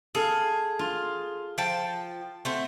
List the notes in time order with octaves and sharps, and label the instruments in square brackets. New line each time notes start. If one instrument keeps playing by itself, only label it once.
[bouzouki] G#4 [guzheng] A4 F5
[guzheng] F4
[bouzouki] F3 G5 A5
A3 C4 F#5